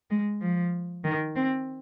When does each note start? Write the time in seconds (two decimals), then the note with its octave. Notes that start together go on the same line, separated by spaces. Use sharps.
0.10 G#3
0.41 F3
1.04 D#3
1.36 C4